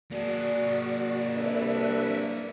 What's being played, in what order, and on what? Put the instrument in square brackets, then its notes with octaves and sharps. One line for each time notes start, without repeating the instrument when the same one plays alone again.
[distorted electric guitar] A#3 G#4 [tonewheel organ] F#4 [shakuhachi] D5
[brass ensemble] C2 D4 [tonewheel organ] B4 E5